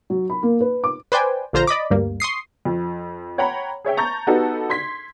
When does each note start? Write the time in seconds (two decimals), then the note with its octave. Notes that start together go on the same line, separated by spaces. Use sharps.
0.10 F#3
0.30 B5
0.43 A#3
0.60 B4
0.84 D6
1.12 B4 C5 D5 G5 G#5
1.53 A#1 D3 F4 C5 A#5
1.67 D5 D#5 B5 D6
1.90 D2 G2 G3 A#3
2.20 C6 C#6 D#6 C7
2.65 F2
3.38 C#5 F#5 G5 A#5 B5
3.85 G#4 C#5 E5 G5
3.97 A5 A#5 C#6 G6 A6
4.27 B3 D#4 F#4 G4 A4 B4
4.70 C6 G#6 B6